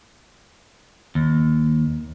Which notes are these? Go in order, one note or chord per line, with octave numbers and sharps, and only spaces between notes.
D#2